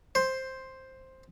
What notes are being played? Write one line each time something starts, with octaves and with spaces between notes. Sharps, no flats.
C5